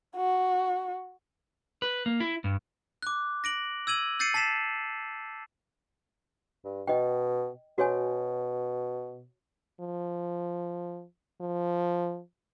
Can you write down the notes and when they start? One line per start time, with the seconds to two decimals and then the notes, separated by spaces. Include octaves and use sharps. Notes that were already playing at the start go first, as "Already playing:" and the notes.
0.16 F#4
1.82 B4
2.06 A#3
2.20 E4
2.44 G2
3.02 D6 F#6
3.44 A#6 D7 F#7
3.87 E6 G#6 D#7 F#7
4.19 E6 G6 A6 C7 C#7 D#7
4.34 A5 A6 B6 C7 E7
6.64 G2
6.88 B2 D#5 G5
7.78 B2 F#4 C#5 G#5
9.80 F3
11.41 F3